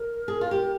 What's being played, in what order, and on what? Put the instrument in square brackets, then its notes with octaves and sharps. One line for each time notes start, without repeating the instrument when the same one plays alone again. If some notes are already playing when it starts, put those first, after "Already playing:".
Already playing: [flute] A#4
[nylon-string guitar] G#4
F4
G4